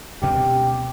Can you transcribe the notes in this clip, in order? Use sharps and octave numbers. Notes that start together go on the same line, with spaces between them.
D2 B2 C4 G4